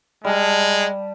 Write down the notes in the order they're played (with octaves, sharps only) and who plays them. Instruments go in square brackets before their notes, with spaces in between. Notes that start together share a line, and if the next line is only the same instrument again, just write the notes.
[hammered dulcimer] G3 A5 [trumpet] G#3